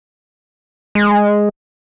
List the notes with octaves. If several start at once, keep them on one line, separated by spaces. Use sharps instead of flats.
G#3